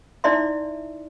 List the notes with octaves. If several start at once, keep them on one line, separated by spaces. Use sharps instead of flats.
D#4 E4 D5 E5 C6